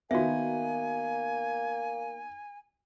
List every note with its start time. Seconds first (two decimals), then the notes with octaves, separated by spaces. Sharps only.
0.11 D#3 A#3 B3 F#4 E5 G#5